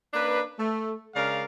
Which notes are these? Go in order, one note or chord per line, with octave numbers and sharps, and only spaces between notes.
A#3 C#4 D4 B4
A3
C#3 G#3 D4 A#4 D5 F5